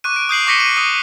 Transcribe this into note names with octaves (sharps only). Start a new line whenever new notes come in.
C#6 D6 F#6 D#7
D7
D#6 G6 C7 F#7
C#6 D6 A#6 B6 C#7 G7
D#7
D#6 D#7